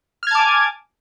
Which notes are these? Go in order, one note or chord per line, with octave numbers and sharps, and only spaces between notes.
G#5 A5 D6 F6 G#6